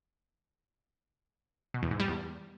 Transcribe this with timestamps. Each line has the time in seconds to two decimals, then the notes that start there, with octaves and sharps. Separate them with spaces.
1.74 B2
1.83 E2
1.91 G#2
2.00 G3
2.08 E2